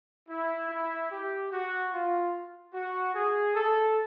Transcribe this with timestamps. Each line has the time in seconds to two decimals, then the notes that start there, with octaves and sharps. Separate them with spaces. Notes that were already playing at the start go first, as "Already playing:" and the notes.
0.29 E4
0.69 E4
1.11 G4
1.52 F#4
1.92 F4
2.74 F#4
3.14 G#4
3.55 A4